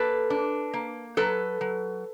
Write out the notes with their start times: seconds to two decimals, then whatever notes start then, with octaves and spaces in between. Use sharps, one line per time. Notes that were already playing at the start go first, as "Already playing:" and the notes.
Already playing: A#3 A4 B4
0.30 D4
0.74 A#3
1.17 F#3 A4 B4
1.61 F#3